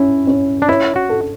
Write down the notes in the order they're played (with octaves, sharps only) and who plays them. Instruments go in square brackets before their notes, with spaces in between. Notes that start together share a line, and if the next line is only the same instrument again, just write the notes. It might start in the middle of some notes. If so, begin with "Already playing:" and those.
Already playing: [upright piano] C#4 [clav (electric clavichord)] E4
[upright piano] C#4
[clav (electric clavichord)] D4
[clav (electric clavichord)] E4 [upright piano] C#5
[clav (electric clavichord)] F#4
[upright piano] A4